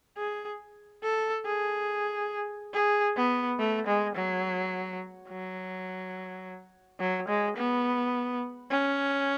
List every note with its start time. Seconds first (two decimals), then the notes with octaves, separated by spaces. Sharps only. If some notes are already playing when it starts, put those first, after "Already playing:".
0.18 G#4
1.03 A4
1.46 G#4
2.73 G#4
3.16 B3
3.59 A3
3.87 G#3
4.16 F#3
5.29 F#3
7.00 F#3
7.28 G#3
7.57 B3
8.71 C#4